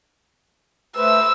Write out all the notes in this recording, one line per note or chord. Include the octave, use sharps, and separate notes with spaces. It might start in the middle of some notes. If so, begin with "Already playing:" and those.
A3 B4 C5 E6